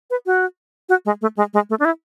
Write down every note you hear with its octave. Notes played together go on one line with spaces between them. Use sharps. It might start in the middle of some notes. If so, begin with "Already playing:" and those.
B4
F#4
F#4
G#3
A3
G#3
G#3
A3
D4
E4